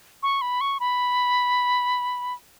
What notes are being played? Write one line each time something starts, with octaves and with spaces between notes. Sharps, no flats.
C#6
B5
C#6
B5